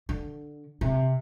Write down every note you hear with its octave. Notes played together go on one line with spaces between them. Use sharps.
D3
C3